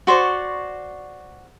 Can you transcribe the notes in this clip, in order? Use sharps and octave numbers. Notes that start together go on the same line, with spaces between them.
F#4 C5 D5 C#6